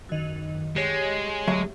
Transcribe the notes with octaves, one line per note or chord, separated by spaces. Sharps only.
F#2 D#3
G#3 G4 C#5
D2 F#3 E5